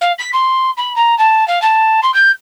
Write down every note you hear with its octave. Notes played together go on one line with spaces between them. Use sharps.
F5
B6
C6
B5
A#5
A5
F5
A5
C6
G6